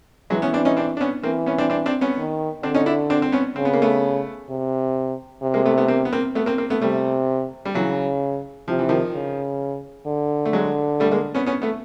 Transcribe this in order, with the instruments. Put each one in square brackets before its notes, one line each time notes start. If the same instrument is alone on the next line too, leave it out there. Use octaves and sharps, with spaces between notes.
[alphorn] E3 [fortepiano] F#3 G#3
[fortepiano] B3 C#4
C4 D4
C#4 D#4
C4 D4
D4
B3 C#4
[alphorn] E3 [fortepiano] A#3 C4
[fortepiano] B3 C#4
C4 D4
C4 D4
C4 D4
B3 C#4
[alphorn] D#3
[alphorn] D3 [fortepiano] C4 D4
[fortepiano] C#4 D#4
D4 E4
C4 D4
C4
B3 C#4
[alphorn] C#3 [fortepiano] C4
[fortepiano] B3
A#3
A3 B3
[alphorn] C3
C3
[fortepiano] G#3 A#3
A3 B3
A3 B3
A#3 C4
B3
A#3 C4
A3 B3
A#3 C4
A#3 C4
A3 B3
[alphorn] C3 [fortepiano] G3 A3
[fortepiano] G3
[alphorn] C#3 [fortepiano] E3 F#3
[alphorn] C3 [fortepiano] F3
[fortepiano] E3
D#3 F3
[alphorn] C#3
D3
[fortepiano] A3
F#3 G#3
G3 A3
G#3 A#3
B3 C#4
B3 C#4
A3 B3